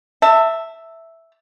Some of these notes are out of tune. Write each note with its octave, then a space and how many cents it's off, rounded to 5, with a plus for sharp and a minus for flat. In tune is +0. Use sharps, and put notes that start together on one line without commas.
E5 +0 A5 +30